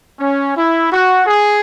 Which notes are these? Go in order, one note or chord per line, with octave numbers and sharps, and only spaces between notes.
C#4
E4
F#4
G#4